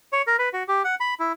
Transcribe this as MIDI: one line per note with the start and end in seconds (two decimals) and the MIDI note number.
0.13 0.22 73
0.27 0.36 70
0.39 0.49 71
0.53 0.63 66
0.68 0.83 67
0.84 0.95 78
1.00 1.14 83
1.20 1.32 64